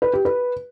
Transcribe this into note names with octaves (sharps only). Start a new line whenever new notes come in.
B4
G4
B4